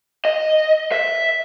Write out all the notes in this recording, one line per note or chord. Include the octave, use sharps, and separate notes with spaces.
D#5
E5